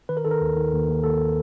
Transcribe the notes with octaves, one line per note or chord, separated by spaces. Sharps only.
D#3 B4
A#4
D#3 A4
A#4
D#2
D#3
D#2
D#2
D#2 A4